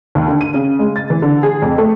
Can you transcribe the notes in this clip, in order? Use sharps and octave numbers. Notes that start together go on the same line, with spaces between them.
D#2
D3
D#7
C#3
G#3
A6
E3
D3
G#4
F2
A3